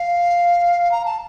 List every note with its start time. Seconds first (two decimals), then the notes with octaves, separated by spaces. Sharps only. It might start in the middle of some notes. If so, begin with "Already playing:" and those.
Already playing: F5
0.91 A#5
1.05 A5